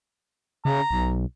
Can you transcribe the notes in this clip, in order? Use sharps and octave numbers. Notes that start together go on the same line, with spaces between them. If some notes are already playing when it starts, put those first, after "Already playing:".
C#3 A#5
B1